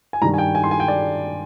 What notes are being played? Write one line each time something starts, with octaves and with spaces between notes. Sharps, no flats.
G#5
G2 D#3 G3 A#5
G#5
G5
G#5
C6
G#5
G5
D5